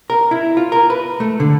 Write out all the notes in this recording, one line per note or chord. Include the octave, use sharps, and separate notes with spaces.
A#4
E4
F4
A#4
B4
A3
D3